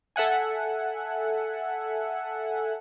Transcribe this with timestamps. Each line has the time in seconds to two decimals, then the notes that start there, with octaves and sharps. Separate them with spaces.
0.16 A4 E5 F#5 G#5